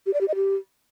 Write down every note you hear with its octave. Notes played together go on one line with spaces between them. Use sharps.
G4
D5
G4
D#5
G4